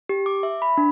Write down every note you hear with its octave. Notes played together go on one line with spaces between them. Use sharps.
G4
D6
E5
B5
D4